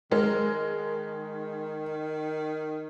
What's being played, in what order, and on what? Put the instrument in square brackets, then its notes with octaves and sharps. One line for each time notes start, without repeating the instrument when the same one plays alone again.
[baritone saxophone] D#3 [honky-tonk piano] G#3 A#4